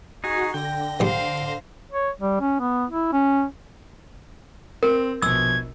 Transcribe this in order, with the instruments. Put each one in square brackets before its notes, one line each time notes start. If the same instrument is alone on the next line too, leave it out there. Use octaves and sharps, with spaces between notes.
[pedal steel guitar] D#4 G#4 [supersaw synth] F#4
[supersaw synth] D3 A#6 [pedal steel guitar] G5
[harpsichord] A#1 G3 [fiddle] C5 F5
[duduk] C#5
G3
C#4
B3
E4
C#4
[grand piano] C4 [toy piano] A#4
[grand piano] A#1 B2 [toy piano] E6 [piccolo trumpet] G#6